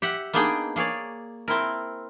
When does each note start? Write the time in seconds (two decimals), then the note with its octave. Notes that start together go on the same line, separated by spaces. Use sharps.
0.02 G4 E5 F#5
0.33 A#3 B3 D4 D#4 G#4 G5
0.76 A#3 G#4 C#5 D5
1.48 C4 E4 A#4